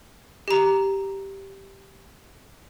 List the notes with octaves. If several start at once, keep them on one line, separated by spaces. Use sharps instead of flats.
G4 A#5